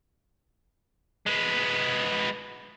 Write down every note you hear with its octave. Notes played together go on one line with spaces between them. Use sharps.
G#3 B3